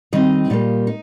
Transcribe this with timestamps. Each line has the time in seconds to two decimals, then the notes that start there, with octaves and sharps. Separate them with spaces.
0.13 D#3 G3 C4 D#4 D#5
0.50 A#2 G3 A#3
0.87 D#4